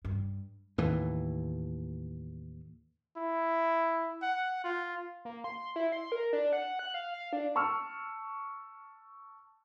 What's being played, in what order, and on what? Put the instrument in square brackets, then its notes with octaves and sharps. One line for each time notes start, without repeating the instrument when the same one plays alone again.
[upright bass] G2
[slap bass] D#2 A2 E3
[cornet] E4
F#5
F4
[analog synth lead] A#3
C6
E4
C6
A#4
D4
F#5
F#6
F5
F5
D4
[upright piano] A5 C#6 E6 F6